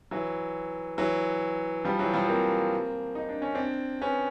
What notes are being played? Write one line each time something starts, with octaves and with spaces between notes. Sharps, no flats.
E3 F#3
E3 F#3
F3 G3
E3 F#3
F3 G3
A#3 C4
D#4
D4
C#4
C4 D4
B3 C#4